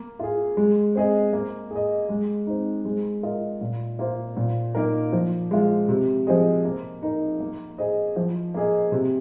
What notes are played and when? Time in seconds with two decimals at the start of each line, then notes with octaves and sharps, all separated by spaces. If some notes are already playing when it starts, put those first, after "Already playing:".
Already playing: A#3
0.19 F4 G#4
0.57 G#3
0.95 C4 G#4 D#5
1.33 A#3
1.71 G#4
1.76 D#5
2.09 G#3
2.47 C4 D#4
2.85 G#3
3.23 F4 A#4 D#5
3.61 A#2
3.99 A#3 F4 C5
4.37 A#2
4.75 A#3 D#4 A#4
5.13 F3
5.51 G#3 F4
5.88 C3
6.27 F3 C4 G#4 D#5
6.65 A#3
7.02 D#4 A#4
7.40 A#3
7.78 G#4 C5 D#5
8.16 F3
8.54 A#3 G#4 D#5
8.92 C3